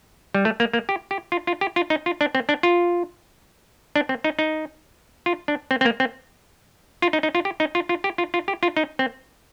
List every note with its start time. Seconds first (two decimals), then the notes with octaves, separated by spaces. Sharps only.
0.35 G3
0.45 A3
0.60 A#3
0.73 A#3
0.89 G4
1.11 G4
1.32 F4
1.47 F4
1.61 G4
1.76 F4
1.90 D#4
2.06 F4
2.21 D4
2.35 C4
2.49 D4
2.63 F4
3.96 D4
4.09 C4
4.24 D#4
4.39 D#4
5.26 F4
5.48 D4
5.71 C4
5.81 C4
5.85 A#3
6.00 C4
7.02 F4
7.13 D#4
7.23 D#4
7.35 F4
7.45 G4
7.60 D#4
7.75 F4
7.89 F4
8.04 G4
8.18 F4
8.34 F4
8.48 G4
8.63 F4
8.77 D#4
8.99 C4